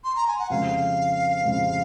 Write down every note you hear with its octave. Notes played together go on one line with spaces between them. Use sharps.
C6
A#5
G#5
F#5
F2 C#3 G#3 F5
F2 C#3 G#3